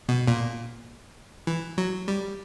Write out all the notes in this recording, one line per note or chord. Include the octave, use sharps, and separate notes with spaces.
B2
A#2
E3
F#3
G3